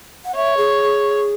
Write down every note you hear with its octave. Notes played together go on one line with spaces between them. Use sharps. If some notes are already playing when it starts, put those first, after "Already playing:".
F#5
C#5 E5
G#4